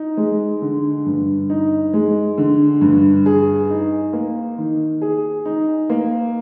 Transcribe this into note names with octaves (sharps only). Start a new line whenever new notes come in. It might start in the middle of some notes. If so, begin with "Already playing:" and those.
Already playing: D#4
G#3
D3
G2
D#4
G#3
D3
G2
G#4
D#4
A#3
D#3
G#4
D#4
A#3